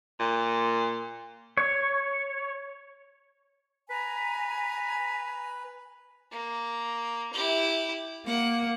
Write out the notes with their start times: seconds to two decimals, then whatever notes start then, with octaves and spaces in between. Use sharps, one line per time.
0.20 A#2
1.57 C#5
3.90 B4 G#5 A#5 B6
6.31 A#3
7.33 E4 G4
8.27 A#3 F#5